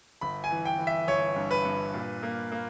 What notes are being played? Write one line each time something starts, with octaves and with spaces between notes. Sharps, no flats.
G1 B5
G#5
E3
G5
E3
E5
G1 C#5
G2
B4
G2
A#2
A#3
A#3